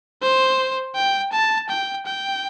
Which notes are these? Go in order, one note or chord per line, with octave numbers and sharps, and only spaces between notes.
C5
G5
A5
G5
G5